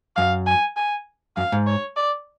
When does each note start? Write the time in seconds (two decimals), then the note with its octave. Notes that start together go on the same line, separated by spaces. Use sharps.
0.16 F#2 F5
0.47 G#5
0.77 G#5
1.37 F#2 F5
1.52 G#2
1.67 C#5
1.96 D5